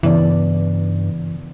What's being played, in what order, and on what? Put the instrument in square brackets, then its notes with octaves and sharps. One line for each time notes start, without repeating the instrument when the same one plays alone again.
[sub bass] G2 [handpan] C#3 B3 D5 [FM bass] E3